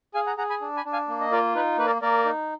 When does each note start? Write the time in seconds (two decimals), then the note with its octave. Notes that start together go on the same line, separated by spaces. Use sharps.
0.14 G#4 F5 G#5
0.26 F#5 A#5
0.38 G#4 F#5 A#5
0.50 G#5 B5
0.61 D4
0.77 G#5 B5
0.85 D4
0.93 F5 G#5
1.08 A#3
1.21 D#5
1.32 F4 A#4 D5
1.55 D#4 B4
1.78 A#3 B4
1.86 A#4 D5
2.02 A#3 A#4 D5
2.25 D#4